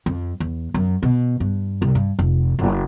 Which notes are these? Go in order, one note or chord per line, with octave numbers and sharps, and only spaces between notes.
F2
E2
F#2
B2
G2
C2
G2
F1
F#1